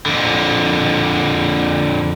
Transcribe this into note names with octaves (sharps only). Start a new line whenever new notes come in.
F2 D3